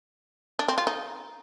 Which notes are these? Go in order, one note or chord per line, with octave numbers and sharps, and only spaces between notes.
D4
C4
F4
D#4